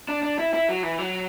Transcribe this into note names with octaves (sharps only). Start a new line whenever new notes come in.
D4
D4
E4
E4
F#3
E3
F#3